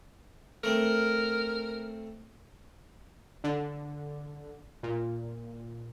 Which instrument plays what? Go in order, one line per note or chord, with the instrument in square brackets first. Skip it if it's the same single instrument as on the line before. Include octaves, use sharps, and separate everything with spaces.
[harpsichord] A3 C4 [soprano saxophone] A#4
[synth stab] D3
A#2